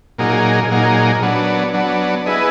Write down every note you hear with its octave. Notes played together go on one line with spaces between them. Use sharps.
A#2 F#3 A#3 D#4 G#4
A#2 F#3 A#3 D#4 G#4
F#3 B3 D4
F#3 B3 D4
B3 E4 G#4 B4 D#5